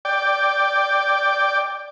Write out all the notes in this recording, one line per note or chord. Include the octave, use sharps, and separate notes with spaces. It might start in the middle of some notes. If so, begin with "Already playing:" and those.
D5 G5